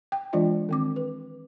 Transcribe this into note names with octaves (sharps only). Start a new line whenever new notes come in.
G5
E3 G#3 D4 F4 D5 D#5
D#3 C4 D6
B4